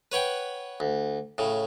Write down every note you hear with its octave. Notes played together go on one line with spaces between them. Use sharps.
B4 C#5 F#5 G5
D2
A2 C#3